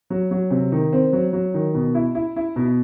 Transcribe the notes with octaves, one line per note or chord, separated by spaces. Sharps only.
F#3
F#3
C3
D#3
C4
F#3
F#3
D#3
B2
E4
E4
E4
B2